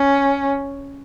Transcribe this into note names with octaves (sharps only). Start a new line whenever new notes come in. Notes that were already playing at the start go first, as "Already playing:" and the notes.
Already playing: C#4